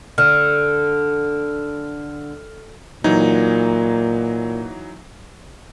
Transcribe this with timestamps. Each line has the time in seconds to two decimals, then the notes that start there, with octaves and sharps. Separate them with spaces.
0.18 D3 F6
3.04 A#2 E3 F#3 D#4